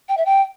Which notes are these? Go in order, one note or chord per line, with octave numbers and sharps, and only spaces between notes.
G5
E5
G5